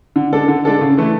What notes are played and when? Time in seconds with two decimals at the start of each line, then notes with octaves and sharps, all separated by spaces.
0.16 D3
0.33 G#3 D4 A4
0.48 D3
0.65 G#3 D4 A4
0.81 C#3
0.97 E3 A3 E4